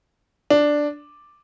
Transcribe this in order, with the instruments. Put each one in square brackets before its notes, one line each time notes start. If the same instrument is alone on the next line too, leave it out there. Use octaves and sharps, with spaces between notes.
[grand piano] D4